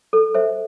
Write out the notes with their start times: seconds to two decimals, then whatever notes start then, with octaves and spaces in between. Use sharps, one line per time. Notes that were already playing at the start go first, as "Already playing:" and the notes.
0.13 A4
0.34 C5 E5